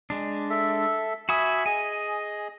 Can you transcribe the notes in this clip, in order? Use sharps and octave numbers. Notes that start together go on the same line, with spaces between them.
G#3 D4
A4 E5
F#4 E5 G#5 B5 D#6
G#4 D#5 G#5